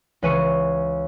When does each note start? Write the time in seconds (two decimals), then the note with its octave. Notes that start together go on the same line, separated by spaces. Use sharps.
0.22 C#2 E3 B4 G#5 C#6 C#7